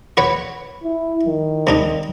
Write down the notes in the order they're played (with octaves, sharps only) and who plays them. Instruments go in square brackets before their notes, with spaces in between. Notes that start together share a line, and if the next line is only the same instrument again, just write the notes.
[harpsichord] F#4 B4 C#5
[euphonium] E4
D#3
[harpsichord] C3 D4 D#4